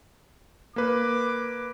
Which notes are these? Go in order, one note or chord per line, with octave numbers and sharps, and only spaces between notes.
A#3 B4 D6